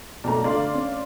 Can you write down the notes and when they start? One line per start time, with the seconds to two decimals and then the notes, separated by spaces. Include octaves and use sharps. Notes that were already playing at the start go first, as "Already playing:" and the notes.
0.24 B1 A3 D5 A#5
0.44 D3 A3 D5 F5 C6
0.74 C#4